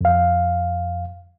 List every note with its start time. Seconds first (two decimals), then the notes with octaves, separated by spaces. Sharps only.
0.01 F2 F5